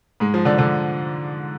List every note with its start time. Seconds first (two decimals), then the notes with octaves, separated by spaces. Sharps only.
0.20 G#2 G#3
0.34 F3
0.45 D3 D4
0.58 D3 D4